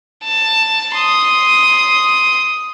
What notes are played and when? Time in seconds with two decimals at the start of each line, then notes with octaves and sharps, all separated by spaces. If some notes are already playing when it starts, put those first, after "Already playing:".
0.24 A5
0.96 C6 D#6